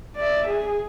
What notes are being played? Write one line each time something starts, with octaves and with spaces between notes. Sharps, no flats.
D5 E5
G#4